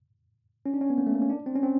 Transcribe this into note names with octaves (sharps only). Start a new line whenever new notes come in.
C#4
D4
C#4
B3
A#3
A3
A#3
C#4
D4
C4
C#4
C4